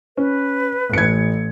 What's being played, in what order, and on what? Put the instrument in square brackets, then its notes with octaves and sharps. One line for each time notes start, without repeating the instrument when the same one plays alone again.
[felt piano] C#4 [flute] B4
[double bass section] A1 [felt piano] G#6 C#7